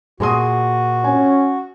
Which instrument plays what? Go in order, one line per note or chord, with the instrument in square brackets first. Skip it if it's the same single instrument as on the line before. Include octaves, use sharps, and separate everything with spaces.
[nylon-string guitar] A#2 [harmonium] F#4 [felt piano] G#4 C6 D#6
[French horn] C#4 [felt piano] G#5